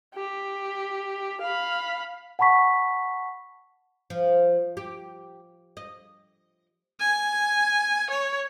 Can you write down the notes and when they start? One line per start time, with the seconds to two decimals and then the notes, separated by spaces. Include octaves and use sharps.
0.15 G4
1.42 F5 B5
2.39 F#5 A5 B5 C#6 B6
4.10 F3
4.77 G4
5.77 D#5
7.00 G#5
8.10 C#5